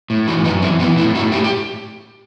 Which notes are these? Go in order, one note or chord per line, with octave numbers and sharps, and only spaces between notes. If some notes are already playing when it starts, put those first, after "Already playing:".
A2
E3 D#4 F#4
F#2 B3 D#4
E3 C4 E4
E3 B3 D#4
A2 C4 E4
A2 D#4 F#4
A2 E4 G4
G4